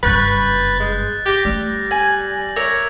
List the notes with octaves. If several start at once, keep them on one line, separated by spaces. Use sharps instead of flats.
F#1 G2 B4 C#6 F#6 G6 A6
G#3
G4 G6 A#6
G3 A3
G#5 F#7
A#4 C#5 E5 D6 G#6 A#6